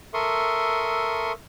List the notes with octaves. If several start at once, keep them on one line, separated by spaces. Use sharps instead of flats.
A4 A#4 E5 C6 C#6 D#6